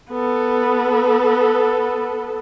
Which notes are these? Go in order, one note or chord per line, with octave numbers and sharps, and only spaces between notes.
B3 A4